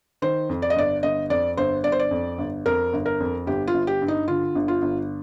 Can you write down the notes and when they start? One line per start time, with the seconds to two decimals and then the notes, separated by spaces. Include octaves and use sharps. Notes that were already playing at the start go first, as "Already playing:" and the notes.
0.22 D#3 C5
0.49 F2
0.62 D5
0.70 D#5
0.76 G1 D5
1.03 G1 D#5
1.30 F2 D5
1.57 G1 C5
1.84 G1 D5
1.92 C5
1.99 D5
2.11 F2
2.38 G1
2.66 F2 A#4
2.93 G1
3.06 A#4
3.20 F2
3.47 G1 G4
3.67 F4
3.74 G1
3.87 G4
4.02 G2
4.08 D#4
4.28 D3 F4
4.55 G1
4.68 F4
4.82 G1